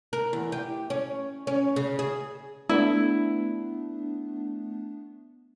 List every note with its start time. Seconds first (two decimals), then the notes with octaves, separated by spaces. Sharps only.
0.13 A#4
0.33 E2
0.52 G4
0.90 C#4
1.47 C#4
1.76 C#3
1.99 G#4
2.69 A3 B3 D4 E4